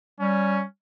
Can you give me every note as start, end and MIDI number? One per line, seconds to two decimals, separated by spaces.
0.20 0.64 55
0.20 0.63 61